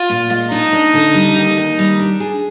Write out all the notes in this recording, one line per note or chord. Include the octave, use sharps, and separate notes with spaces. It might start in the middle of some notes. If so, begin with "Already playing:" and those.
Already playing: F4
A#2
G#3
D4 D#4
D4
D3
G3
D#2
D#2
G3
D4
G#4